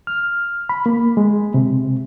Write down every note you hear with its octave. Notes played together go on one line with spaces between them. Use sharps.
F6
B5
A#3
G#3
C3